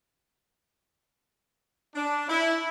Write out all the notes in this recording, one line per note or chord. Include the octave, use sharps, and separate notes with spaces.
D4
E4